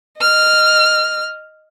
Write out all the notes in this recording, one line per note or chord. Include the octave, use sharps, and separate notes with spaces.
D#5 F6